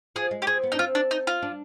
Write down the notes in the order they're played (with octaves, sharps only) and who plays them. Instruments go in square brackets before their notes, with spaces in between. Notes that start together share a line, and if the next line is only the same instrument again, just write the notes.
[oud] F3 [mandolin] G#4
[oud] G#3
[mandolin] G4
[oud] C4 [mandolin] G#4
[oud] B3
[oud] D4 [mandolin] D#4
[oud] C4 [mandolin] F4
[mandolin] D4
D#4
F4
[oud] D4